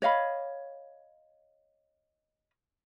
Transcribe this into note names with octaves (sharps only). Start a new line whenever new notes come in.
C#5 D#5 F5 B5